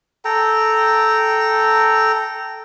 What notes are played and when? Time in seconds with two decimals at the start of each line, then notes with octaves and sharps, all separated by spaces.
0.25 A4 G5 A#5